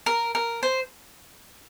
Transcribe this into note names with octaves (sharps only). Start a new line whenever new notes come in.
A#4
A#4
C5